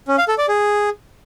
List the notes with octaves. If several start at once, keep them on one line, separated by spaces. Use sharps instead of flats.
C#4
F5
A4
D5
G#4